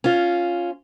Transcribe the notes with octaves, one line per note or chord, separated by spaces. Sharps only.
C#4 F4